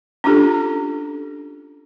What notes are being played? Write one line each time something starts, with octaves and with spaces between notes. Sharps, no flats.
C#4 D4 F4 G4 A4